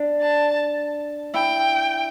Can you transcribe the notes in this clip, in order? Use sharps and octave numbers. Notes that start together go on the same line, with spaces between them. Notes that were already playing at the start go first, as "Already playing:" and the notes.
Already playing: D4
A5
E4 G5